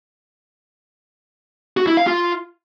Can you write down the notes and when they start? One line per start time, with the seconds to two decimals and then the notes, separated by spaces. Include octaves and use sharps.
1.77 F#4
1.87 E4
1.97 F5
2.07 F4